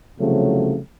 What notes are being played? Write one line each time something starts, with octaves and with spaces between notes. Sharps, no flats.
C2 C#3 F3 F#3 A3